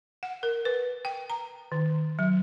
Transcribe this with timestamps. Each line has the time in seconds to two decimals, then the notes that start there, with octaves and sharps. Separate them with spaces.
0.23 F#5
0.43 A#4
0.65 B4
1.05 G5
1.30 A#5
1.72 D#3
2.19 F#3